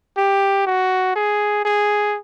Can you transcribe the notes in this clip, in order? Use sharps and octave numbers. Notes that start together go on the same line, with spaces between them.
G4
F#4
G#4
G#4